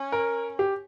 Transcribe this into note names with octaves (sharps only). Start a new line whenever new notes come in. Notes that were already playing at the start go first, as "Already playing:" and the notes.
Already playing: C#4
A#4
G4